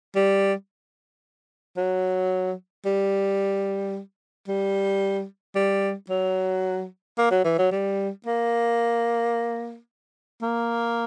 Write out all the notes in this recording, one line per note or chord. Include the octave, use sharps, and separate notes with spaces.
G3
F#3
G3
G3
G3
F#3
A#3
F#3
E3
F#3
G3
A#3
A#3